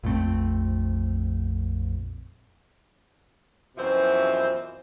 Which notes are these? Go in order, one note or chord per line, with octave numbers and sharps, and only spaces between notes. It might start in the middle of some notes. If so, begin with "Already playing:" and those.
A#1 F2 A3 C4
F#2 B2 E3 F3 C4 E5